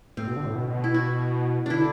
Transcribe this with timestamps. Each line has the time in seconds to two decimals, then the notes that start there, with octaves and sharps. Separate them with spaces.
0.17 A2 C4
0.27 B2
0.37 D3
0.46 A2
0.55 B2
0.84 E4
0.94 F#4
1.66 D3 D4 E4